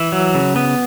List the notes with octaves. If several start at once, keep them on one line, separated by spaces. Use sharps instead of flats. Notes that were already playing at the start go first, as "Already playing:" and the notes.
Already playing: E3 E5
F#3
C#3
B3